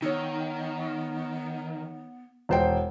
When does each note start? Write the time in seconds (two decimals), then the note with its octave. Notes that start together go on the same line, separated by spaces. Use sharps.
0.02 D#3 B3 D#4 C#5
2.49 E1 C5 G5